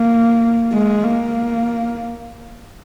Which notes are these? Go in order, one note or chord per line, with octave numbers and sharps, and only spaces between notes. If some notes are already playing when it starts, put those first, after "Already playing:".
Already playing: A#3
G#3
A#3